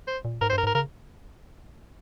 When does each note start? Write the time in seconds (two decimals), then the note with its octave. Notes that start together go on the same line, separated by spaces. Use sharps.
0.07 C5
0.25 A#2
0.41 G#2 A#4
0.50 C5
0.53 G2 A#4
0.63 G#2 A#4
0.75 C#3 A#4